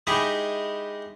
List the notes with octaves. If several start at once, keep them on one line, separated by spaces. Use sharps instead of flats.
G#3 D#4 E4 G4 G#4 E5